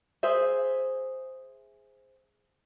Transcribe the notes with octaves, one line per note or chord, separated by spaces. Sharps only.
G#4 C5 E5